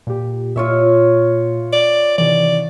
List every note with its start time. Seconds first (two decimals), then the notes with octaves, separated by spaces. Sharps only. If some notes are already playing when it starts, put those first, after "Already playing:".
0.07 A#2 G4
0.56 A#2 F4 C#5 E5
1.73 D5
2.18 C3 D#3 E3 D5